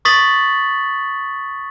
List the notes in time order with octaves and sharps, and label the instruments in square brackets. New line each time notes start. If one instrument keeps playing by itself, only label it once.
[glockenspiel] C#6 D#6 A6 B6 F#7